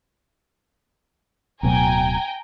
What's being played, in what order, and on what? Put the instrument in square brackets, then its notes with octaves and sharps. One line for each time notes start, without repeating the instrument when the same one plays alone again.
[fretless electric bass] D1 B2 F#3 [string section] G5 G#5 A#5